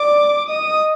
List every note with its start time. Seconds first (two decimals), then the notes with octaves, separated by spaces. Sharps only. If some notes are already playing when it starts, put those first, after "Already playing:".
Already playing: D5 D6
0.48 D#5 D#6
0.64 D#5